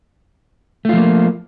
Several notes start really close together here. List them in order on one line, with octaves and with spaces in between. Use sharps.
A3 F4 F3 A#3